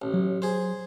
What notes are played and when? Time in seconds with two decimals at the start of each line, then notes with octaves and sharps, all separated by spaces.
0.02 A1
0.14 F#3
0.42 G#4 C5